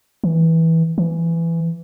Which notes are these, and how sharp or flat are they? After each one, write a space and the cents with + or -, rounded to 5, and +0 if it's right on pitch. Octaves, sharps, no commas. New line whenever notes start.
E3 -15
E3 +15